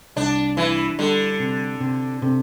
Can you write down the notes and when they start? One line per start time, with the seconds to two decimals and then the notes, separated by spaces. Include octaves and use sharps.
0.16 C2 D4
0.57 E3 E4
0.99 D3 G3
1.40 C3
1.80 C3
2.22 C3